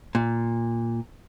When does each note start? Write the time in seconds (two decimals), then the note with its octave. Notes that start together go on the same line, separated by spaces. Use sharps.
0.15 A#2